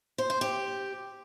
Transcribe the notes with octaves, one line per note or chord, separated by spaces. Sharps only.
C5
C5
G4